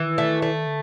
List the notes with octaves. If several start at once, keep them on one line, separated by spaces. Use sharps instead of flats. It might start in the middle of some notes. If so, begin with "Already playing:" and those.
Already playing: D#3 E3
A3
A3
D3